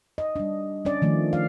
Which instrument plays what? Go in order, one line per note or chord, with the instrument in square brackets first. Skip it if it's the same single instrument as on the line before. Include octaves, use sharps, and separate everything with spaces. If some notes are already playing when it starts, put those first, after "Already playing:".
[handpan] D#5
G3 D4
C#4 D4 D5
D#3 F3 A3
F5